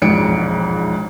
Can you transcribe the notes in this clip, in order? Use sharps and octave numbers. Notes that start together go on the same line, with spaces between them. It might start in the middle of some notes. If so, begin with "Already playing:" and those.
E1 A#1 F2 G#2 C#7 D7